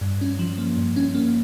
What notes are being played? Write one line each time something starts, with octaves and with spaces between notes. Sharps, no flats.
G2
C#4
F3
A#3
G2
C#4
A#3